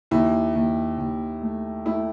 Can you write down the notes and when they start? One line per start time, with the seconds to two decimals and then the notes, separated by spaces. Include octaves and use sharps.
0.11 D#2 E4
0.55 D#2
0.98 D#2
1.42 A3
1.85 A3 E4